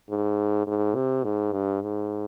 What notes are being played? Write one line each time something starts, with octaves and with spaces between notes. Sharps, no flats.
G#2
G#2
C3
G#2
G2
G#2